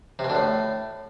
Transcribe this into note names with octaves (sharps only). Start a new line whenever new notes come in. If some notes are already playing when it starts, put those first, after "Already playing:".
C3
B2
D3
A2